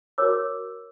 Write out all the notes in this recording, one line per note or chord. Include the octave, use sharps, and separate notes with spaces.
F#4 A#4 C#5 D6 E6